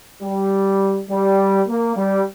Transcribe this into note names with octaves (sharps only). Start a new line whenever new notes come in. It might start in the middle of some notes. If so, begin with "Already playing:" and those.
G3
G3
A#3
G3